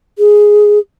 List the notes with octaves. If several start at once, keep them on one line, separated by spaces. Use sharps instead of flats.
G#4